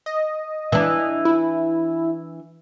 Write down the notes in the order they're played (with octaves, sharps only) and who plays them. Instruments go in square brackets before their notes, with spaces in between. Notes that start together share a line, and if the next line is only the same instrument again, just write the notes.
[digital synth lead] D#5
[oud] E3 D4
[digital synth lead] E4